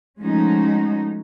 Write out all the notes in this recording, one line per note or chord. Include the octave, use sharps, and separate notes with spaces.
F3 G#3 A3 C#4 D#4 F#4